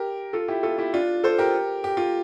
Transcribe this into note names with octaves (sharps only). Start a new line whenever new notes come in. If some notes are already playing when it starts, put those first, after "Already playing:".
Already playing: G4 A#4
F4 A4
E4 G4
F4 A4
E4 G4
D4 F4
A4 C5
G4 A#4
G4
F4